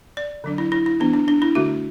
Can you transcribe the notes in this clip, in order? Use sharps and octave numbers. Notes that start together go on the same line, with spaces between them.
D5
D3 F#3 D4
E4
E4
E4
E3 B3 D4
D4
D4
E4
D3 A3 D4 F#4